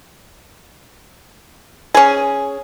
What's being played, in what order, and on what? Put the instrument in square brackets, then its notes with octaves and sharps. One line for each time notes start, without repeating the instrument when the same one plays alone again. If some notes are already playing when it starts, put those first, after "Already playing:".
[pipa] C#4 G#4